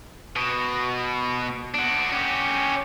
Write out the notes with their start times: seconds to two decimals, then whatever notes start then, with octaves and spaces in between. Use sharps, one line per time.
0.36 B2
1.74 D4 F#4
2.12 C#4 G4